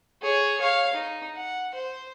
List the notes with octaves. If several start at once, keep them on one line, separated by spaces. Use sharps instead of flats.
G#4 C#5
C#5 F5
D#4
F#5
C5